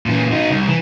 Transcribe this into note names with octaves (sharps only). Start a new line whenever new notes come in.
A#2 E3
D#4 F#4
C2
E3